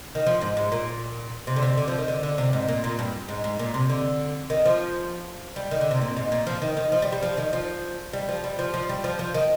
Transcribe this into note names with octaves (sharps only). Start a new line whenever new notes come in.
D#3
F3
G#2
G#2
A#2
C3
D3
C3
D3
F3
D#3
D3
D3
C3
G#2
A#2
A#2
G2
G#2
G#2
A#2
C3
D3
D#3
F3
G3
D#3
D3
C3
A#2
G#2
A#2
F3
D#3
D#3
F3
G3
G3
F3
D#3
F3
G3
F3
G3
F3
F3
G3
F3
F3
D#3